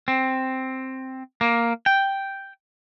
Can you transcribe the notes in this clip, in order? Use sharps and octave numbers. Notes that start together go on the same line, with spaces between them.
C4
A#3
G5